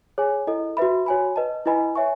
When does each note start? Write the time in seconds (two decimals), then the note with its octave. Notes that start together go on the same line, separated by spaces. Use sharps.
0.18 G#4 C#5 G#5
0.47 E4 A4 D#5
0.77 F#4 B4 E5 B5
1.06 F#4 C#5 G#5 B5
1.36 B4 D#5 A5
1.66 E4 B4 D#5 G#5 B5
1.95 C#5 E5 G#5 C#6